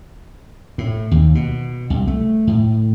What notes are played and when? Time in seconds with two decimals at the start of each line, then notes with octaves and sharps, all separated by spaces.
0.78 A2
1.11 D#2
1.35 B2
1.90 C2
2.07 A3
2.47 A2